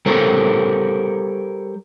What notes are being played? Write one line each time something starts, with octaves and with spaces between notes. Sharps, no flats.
G3 A4 A#4 C5 C#5